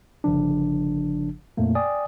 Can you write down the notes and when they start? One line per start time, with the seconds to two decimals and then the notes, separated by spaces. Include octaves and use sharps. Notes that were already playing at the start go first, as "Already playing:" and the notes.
0.24 G1 C#3 F3 D4
1.57 F2 A#2 A3 A#3
1.75 D5 G5 G#5 D#6